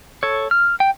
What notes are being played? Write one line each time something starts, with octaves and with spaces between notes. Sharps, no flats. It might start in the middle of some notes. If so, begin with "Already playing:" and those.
A4 C#5
F6
G5